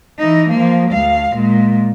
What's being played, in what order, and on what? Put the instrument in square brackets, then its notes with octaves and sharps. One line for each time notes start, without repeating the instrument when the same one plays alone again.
[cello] E3 D#4
F3 A#3
D2 F5
A#2 G#3